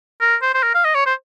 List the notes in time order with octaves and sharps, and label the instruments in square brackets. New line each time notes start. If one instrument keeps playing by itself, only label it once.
[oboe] A#4
C5
C5
A#4
F5
D#5
C#5
C5